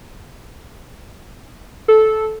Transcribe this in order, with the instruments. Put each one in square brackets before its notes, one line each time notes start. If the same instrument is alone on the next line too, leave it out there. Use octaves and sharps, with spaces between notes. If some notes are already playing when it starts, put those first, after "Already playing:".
[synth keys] A4